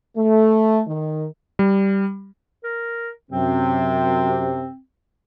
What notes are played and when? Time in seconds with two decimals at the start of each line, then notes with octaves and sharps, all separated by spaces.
0.17 A3
0.88 D#3
1.59 G3
2.64 A#4
3.31 F#2 C3 C4